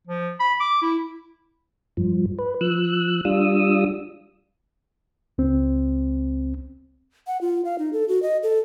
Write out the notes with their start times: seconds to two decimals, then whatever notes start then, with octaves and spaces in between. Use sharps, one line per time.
0.07 F3
0.40 B5
0.61 D6
0.82 E4
1.97 G2 F3
2.39 B4
2.61 F3 E6 F#6
3.25 G3 D4 F4 D#6 E6
5.38 C#2 C4
7.27 F#5
7.41 F4
7.65 F5
7.79 D#4
7.93 A4
8.08 F#4
8.22 D#5
8.43 A4